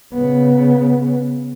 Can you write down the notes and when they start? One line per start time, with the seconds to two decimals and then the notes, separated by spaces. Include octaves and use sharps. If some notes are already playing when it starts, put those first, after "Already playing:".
0.14 C#3 B3